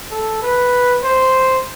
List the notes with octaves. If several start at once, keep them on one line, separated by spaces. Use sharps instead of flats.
A4
B4
C5